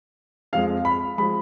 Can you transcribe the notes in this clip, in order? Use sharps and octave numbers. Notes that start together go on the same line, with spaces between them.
F2 F3 G#3 F5
B5
F3 G#3 B5